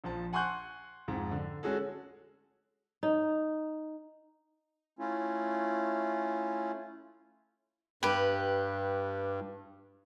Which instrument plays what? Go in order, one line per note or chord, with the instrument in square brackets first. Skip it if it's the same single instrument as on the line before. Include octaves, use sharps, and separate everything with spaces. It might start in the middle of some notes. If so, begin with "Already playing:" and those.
[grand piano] A#1 F3 A5
F#5 G#5 C6 C#6 F#6 G6
F2 G#2
D3
G#3 C#4 F#4 G#4 A4
[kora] D#4
[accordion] A3 C#4 E4 F4
[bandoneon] G2 [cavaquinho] G4 B4